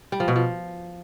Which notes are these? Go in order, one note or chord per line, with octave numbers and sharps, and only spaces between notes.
G3
F3
B2
F3